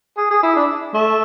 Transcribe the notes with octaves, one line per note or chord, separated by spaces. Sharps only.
G#4
G#4
E4
D4
A3